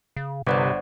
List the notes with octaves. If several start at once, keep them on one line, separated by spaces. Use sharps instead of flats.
C#3
G1 C3 B4 C5 D5 F#5